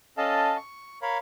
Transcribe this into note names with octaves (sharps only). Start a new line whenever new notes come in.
C#4 A4 D#5 F5 A5
C#6
A#4 C#5 F5 B5